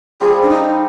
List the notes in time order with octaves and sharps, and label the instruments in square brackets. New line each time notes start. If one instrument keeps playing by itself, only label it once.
[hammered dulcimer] G3 C4 F4 A4 [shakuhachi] G#4
[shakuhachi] D4
D#4